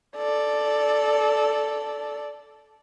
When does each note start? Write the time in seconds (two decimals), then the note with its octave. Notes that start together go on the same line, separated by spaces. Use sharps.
0.17 A4 D5